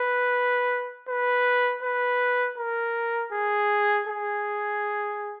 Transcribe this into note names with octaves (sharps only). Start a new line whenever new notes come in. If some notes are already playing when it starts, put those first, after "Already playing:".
Already playing: B4
B4
B4
A#4
G#4
G#4